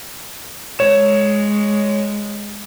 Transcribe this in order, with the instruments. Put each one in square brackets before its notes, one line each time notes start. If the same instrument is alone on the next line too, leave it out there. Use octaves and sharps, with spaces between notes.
[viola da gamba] G#3 [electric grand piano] C#5 E7